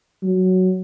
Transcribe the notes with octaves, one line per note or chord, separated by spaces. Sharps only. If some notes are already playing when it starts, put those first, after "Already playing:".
F#3